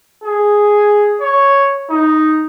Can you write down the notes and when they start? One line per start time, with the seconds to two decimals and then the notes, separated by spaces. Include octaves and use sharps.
0.24 G#4
1.20 C#5
1.90 D#4